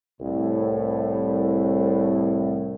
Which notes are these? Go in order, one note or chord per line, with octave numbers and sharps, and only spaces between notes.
C2 A2